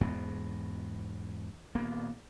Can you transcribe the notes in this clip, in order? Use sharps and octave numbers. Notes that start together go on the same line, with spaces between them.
E2 G#2 B2 B3
D#1 A#3 B3